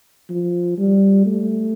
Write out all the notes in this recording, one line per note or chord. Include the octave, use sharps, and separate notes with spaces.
F3
G3
A3